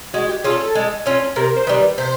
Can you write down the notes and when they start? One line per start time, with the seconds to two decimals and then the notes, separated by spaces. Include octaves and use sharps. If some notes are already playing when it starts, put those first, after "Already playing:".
0.14 G#3 F#4
0.29 G4
0.44 C#4 F4 G#4 A4
0.60 A4
0.75 G#3
1.06 C#4 F4 A4
1.36 C3 A#4
1.56 C5
1.67 D#3 G3 B4
1.98 C3 C5